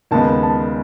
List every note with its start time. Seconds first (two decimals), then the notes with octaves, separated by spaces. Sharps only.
0.11 D#2 C#3 G#3 B3 A5
0.43 A5